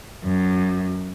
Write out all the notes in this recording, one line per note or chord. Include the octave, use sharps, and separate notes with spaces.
F#2